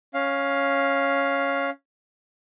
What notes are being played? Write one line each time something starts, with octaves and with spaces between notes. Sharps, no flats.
C#4 F5